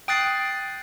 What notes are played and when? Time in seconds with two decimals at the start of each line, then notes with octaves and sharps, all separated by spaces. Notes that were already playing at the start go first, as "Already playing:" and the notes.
0.08 G5 D#6 F#6 A6 C7